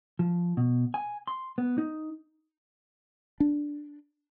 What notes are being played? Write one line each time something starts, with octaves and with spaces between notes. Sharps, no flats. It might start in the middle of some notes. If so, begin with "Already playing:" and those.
F3
B2
G#5
C6
B3
D#4
D4